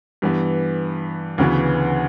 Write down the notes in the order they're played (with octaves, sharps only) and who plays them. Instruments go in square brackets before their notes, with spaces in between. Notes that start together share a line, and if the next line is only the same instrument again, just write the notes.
[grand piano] G2 E3 B3
D2 C#3 E3 B3